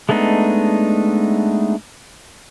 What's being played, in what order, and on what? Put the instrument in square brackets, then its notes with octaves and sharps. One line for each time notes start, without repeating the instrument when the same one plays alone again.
[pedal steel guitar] G#3 A3 B3 D4 D#4